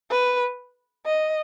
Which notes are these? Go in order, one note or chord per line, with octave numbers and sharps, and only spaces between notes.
B4
D#5